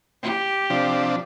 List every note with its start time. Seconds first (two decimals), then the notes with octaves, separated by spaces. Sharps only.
0.22 G4
0.70 C3 F3 D4